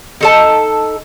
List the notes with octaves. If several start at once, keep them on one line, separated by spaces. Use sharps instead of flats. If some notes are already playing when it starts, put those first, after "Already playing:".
D#4 A4 A5